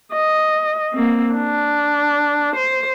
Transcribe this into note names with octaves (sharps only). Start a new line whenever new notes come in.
D#5
A#3 C4
D4
C5